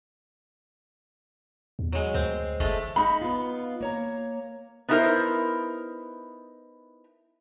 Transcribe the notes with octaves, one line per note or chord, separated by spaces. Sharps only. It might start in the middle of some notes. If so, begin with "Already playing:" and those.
E2
F#3 G#3
D2 C4
G1 G#3 A3
G#3 D#4 B5
B3 F4
A#3 C#5 A#5
B3 D#4 E4 F#4 A#4 C5